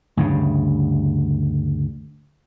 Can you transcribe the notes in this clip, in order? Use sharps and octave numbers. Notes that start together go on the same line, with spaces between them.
D2 G2 C#3